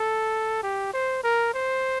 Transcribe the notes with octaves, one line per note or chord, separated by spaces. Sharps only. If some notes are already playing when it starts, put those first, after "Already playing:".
Already playing: A4
G4
C5
A#4
C5